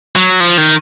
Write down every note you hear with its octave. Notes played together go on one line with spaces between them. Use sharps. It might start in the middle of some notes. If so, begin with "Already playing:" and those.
F#3
F3
D#3